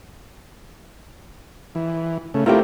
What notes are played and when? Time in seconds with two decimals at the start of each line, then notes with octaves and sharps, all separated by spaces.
1.75 E3
2.34 C#3 A3
2.46 A3 C4 E4 F4 G4 A#4